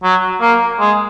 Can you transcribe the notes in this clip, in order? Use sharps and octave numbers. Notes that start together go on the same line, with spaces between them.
F#3
A#3
G#3